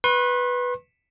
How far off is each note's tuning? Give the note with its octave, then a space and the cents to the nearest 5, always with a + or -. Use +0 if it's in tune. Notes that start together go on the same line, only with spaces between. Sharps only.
B4 -5 C6 +45